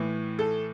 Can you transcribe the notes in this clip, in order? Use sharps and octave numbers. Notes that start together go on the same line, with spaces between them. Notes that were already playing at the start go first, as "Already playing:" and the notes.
Already playing: A2 E3
A4